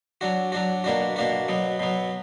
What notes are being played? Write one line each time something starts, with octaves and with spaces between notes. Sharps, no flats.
F#3 D4 F#4
F#3 D4 F#4
B2 A#3 D4 F#4
B2 A#3 D4 F#4
B2 F#3 B3
B2 F#3 B3